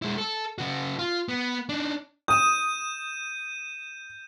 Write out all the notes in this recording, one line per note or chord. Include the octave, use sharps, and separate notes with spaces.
G#3 E4
A4
C#3 F#4
F4
B3
D4 D#4
D#6 G6 D#7 E7